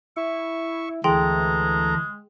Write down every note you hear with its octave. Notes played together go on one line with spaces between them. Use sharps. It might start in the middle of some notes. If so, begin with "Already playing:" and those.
E4 E5 C#6
D2 E3 G#3 G#4 A4 G5 A#5 C6